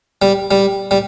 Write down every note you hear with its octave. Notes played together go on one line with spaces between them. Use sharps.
G3
G3
G3